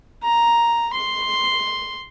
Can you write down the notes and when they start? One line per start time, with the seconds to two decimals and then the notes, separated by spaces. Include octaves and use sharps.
0.24 A#5
0.94 C6